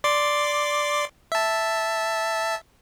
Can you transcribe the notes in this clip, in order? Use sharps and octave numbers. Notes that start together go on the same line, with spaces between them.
D5 C6 D6
E5 A5